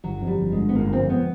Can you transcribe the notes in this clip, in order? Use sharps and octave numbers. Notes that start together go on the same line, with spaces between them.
G1 F#3
F2
G3
G1
G#3
D3
B3
G1 A#3
F2 C4
B3